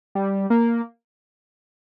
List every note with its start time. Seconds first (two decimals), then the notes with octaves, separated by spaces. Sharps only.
0.15 G3
0.50 A#3